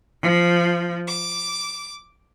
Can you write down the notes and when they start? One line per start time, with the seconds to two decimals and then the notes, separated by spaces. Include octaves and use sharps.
0.20 F3
1.06 D6